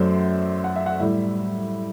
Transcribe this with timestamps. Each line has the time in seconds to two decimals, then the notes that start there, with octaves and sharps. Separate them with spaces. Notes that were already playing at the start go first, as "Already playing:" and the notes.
Already playing: F#2 F#3 A3 C5 D5
0.64 F#5
0.76 E5
0.86 F#5
1.00 A2 G3 E5